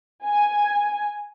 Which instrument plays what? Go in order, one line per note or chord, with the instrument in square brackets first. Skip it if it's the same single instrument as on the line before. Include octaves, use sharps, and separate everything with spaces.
[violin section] G#5